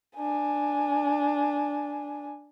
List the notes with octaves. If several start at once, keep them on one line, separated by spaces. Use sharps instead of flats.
D4 G#5